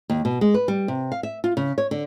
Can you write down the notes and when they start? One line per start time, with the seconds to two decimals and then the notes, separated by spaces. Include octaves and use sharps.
0.10 D#2
0.25 B2
0.41 G#3
0.54 B4
0.68 G3
0.88 C3
1.12 F5
1.23 E5
1.44 F4
1.57 C#3
1.78 C#5
1.91 D3